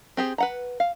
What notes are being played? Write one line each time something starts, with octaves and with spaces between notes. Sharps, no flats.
C4 G4 G#4
B4 F#5 A#5
F5